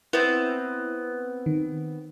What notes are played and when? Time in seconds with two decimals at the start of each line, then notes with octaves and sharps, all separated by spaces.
0.13 B3 C4 E4
1.46 D#3